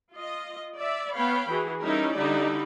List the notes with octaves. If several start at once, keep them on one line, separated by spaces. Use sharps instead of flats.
F4 D#5
D5 E5
B3 C#5 F5 G5 B5
E3 F#4 G#4
G3 C#4 D#4 E4 A#4
D3 G3 D#4 E4 D5